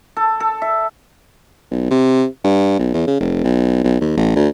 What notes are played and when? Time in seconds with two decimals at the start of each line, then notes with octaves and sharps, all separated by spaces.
0.17 A4
0.40 A4
0.62 E5
1.71 B1
1.90 C3
2.44 G2
2.79 B1
2.94 E2
3.07 C#3
3.20 F1
3.44 B1
3.84 B1
4.01 D#2
4.17 A1
4.36 D2